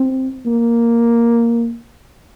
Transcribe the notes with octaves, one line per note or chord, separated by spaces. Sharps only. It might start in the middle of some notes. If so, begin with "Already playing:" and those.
Already playing: C4
A#3